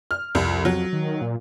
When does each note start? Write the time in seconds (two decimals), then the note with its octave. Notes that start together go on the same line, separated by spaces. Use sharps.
0.11 F6
0.35 C2 F2
0.65 F#3
0.93 D#3
1.21 A#2